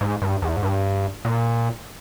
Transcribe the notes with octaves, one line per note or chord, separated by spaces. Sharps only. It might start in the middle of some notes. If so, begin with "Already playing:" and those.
G#2
G2
E2
G#2
G2
A#2